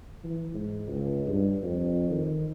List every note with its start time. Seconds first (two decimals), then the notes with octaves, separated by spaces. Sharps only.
0.24 E3
0.54 G#2
0.87 C#2
1.27 G2
1.63 F2
2.10 D#3